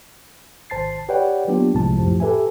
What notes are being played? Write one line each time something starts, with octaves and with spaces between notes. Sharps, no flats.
G#1 C5 A5 A6 C7
G4 B4 C#5 D5 F#5 G5
F#3 A#3 B3 D4 F4 G4
C2 A2 C3 F3 G#3 A5
F#2 A2 F3 G4
G4 A4 B4 E5 G#5